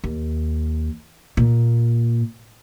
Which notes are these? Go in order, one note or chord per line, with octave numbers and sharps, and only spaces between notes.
D#2
A#2